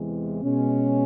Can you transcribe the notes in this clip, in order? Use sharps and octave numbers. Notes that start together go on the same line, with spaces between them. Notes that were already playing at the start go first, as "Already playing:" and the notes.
Already playing: E2 C3 E3 G#3
B2 G#3 C#4